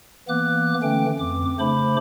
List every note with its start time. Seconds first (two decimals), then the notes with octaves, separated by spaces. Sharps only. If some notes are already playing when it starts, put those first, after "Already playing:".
0.29 E3 A#3 B3 D6 F#6
0.83 D3 E3 A3 C#4 G5
1.19 F2 D6
1.59 C#3 A3 D4 C5 B5 D6